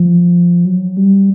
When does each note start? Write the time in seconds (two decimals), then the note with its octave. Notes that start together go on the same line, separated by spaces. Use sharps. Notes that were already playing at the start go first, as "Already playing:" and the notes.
Already playing: F3
0.65 F#3
0.97 G3